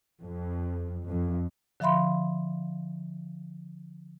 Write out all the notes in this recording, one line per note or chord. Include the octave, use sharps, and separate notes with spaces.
F2
F2
D3 F3 E5 F5 B5 C6